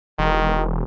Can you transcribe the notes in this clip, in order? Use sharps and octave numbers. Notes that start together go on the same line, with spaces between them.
E1 D#3